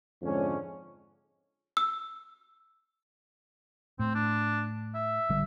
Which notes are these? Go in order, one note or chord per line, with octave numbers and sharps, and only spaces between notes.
F2 G#2 D3 G#3 C#4
E6
A2 C4
D4
E5
G#1 D3 G3